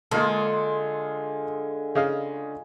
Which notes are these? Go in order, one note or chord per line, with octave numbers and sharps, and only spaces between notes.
D3 G#3 A#3 F4 G#4 A4
C#3 D#5 F5